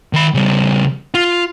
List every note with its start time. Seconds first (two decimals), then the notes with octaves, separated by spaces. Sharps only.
0.13 D#3 B5
0.34 C#3 G3
1.14 F4